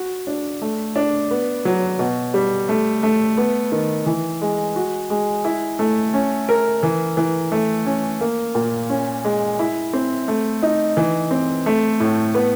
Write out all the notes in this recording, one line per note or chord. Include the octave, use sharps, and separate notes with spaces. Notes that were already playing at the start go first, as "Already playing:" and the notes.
Already playing: F#4
D4
A3
D4
B3
F#3
B2
G3
A3
A3
B3
D#3
E3
G#3
F#4
G#3
E4
A3
C#4
A#4
E3
E3
A3
C#4
A#3
A#2
C#4
G#3
E4
C4
A3
D#4
E3
C4
A3
A2
B3